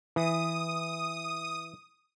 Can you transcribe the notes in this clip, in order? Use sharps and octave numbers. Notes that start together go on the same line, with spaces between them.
E3 D#6